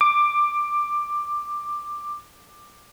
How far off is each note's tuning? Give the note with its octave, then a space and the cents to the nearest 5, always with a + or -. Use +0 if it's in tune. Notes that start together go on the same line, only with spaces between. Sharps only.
D6 +10